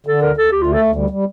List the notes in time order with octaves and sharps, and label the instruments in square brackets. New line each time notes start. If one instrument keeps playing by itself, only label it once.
[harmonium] D3 [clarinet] A4
[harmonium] D2 [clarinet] A#4
[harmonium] D2 [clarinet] A4
[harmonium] D2 [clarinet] G4
[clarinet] F4
[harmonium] A3
[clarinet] A4
[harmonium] D2
G3
G3